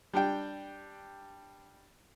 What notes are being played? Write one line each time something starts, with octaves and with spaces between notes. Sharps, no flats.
G3 D4 G5